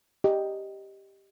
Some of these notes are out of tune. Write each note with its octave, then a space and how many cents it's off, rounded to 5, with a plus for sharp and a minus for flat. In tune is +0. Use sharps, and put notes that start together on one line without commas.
G4 +0 D#5 +5